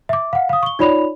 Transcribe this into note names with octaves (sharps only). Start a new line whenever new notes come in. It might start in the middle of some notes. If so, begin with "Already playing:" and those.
E5 D6
F5 F#5
F5 D#6
C#6 G7
D#4 F4 C#5 D5 B5 F7